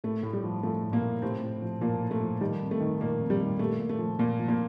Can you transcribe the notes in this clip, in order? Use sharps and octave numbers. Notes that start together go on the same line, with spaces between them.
A2 A3
A2
G3
F3
F3 A3
A2
A#2 A#3
A2
A2 C3 C4
A2
F3
A#2 F3 A#3
A2
A3
F3
D#3 G3
F2
A3
D#3
A#2 D#3 A#3
F2
G3
D#3
A#2 A3
A#2
A3
F3
A#2 A#3
F3
A#2 A#3